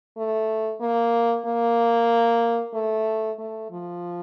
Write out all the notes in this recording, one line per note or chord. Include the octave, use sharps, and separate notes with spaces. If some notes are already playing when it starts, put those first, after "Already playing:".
A3
A#3
A#3
A3
A3
F3